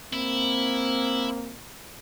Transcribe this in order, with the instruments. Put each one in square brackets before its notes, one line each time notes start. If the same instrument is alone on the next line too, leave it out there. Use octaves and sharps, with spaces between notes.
[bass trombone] A#3 [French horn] C4 [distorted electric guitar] E4